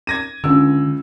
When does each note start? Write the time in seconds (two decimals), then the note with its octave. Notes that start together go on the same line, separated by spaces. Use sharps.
0.07 G#6 A#6 D#7
0.44 C#2 D3 E6